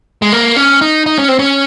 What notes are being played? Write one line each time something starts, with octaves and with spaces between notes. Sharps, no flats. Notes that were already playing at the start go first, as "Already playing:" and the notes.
G#3
A#3
C#4
D#4
D#4
C#4
C4
C#4